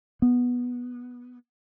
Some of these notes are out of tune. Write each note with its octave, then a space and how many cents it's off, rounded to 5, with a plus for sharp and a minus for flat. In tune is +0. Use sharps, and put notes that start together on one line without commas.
B3 -10